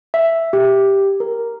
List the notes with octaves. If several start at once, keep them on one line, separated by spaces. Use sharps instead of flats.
E5
G4
A#4